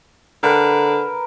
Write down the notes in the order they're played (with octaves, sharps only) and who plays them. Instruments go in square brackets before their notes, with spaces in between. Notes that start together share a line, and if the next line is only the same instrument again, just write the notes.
[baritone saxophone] D3 [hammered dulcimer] A#4 B4